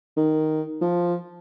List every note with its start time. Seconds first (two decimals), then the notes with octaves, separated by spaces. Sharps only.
0.17 D#3
0.81 F3